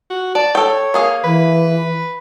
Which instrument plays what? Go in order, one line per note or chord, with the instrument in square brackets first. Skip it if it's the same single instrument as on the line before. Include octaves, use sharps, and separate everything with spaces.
[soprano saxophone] F#4
[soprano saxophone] D5 [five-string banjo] A5
[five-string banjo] A4 G5 [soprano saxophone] C#5
[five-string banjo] A#3 G#4 F5
[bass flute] E3 [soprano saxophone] B4